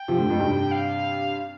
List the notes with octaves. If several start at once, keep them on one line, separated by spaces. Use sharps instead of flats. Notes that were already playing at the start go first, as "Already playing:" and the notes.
Already playing: G5
C3 F3
A2 D3
F2 A2
G2 C3
F5